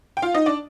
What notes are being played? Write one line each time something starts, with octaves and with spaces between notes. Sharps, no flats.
G5
F4 F5
D#4 D#5
D4 D5